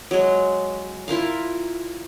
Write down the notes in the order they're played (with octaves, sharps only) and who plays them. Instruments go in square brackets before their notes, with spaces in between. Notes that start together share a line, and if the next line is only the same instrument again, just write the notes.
[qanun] F#3 G#3
E4 F4 A#4 F5